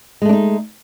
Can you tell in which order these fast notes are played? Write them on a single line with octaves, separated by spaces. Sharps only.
G#3 A3 D4 D#4